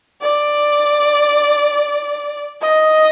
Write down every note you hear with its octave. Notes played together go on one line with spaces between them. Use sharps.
D5
D#5